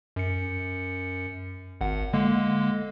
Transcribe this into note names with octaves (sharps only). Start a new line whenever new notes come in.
F#2 C#7
G#1 F#5
D3 G#3 A#3